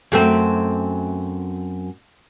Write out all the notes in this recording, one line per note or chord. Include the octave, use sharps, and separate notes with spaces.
F#2 A3 C4